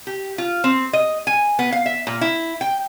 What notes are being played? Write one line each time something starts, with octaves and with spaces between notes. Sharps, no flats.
G4
F4
C4
D#5
G#5
B3
F5
E5
A#2
E4
G5